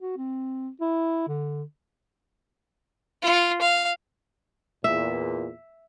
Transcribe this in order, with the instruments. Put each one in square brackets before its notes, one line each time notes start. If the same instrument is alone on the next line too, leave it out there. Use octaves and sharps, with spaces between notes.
[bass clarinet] F#4
C4
E4
D3
[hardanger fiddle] F4
F5
[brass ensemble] E2 A#2 [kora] E5